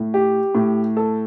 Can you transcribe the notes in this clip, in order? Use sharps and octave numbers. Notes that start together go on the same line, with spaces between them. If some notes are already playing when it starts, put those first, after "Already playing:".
Already playing: A2
G4
A2
A4